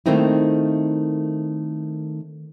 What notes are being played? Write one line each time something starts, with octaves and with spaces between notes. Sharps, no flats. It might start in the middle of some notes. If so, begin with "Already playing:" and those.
D#3 A3 A#3 C4 D#4 E4